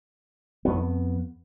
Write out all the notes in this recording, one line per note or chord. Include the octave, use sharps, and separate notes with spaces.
F2 B3